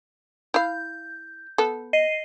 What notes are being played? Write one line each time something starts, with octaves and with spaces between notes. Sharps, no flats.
E4 F5 G6
B3 A4
D#5 C7 D#7